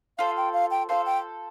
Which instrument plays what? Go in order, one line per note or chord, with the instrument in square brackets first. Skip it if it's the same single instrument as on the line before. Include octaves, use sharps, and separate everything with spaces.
[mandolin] F4 A4 C5 [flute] F5
[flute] G5
F5
G5
[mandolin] F4 A4 C5 [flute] F5
[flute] G5